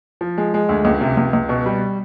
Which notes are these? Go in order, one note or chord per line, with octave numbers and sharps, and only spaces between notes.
F3
G#3
G#3
D2
C#2
C3
C#2
C#2
B2
G3